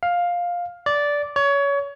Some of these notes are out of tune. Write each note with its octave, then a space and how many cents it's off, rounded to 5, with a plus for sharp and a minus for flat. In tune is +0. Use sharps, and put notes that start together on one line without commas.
F5 +10
D5 -10
C#5 +25